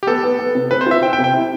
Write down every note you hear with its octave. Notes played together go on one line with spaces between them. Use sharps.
G4
B3 A4
B3
B3
C3
C4 B4
C5
F4 E5
C4 G5
G5
C3
G5
E4